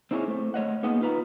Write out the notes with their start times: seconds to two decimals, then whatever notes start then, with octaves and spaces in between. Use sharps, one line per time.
0.11 C4 D#4 E4 G#4 C5 C#5
0.28 A3 C4
0.54 A3 C#5 D#5 F#5
0.83 A#3 B3 D#4 G#4 D#5 F#5
1.01 D#4 F4 B4 A#5